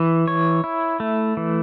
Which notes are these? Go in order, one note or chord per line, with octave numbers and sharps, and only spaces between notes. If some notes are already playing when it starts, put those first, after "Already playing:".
Already playing: E3
C#5
E4
A3
E3